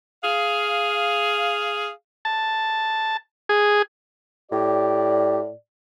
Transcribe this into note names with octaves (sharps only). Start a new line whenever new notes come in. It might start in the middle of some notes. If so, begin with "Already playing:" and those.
G#4 F5
A5
G#4
A2 G4 D5